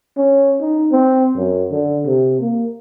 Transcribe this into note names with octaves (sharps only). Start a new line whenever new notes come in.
C#4
D#4
C4
F#2
D3
C3
A#3